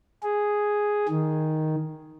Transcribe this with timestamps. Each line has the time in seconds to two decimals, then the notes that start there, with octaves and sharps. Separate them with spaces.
0.23 G#4
1.08 D#3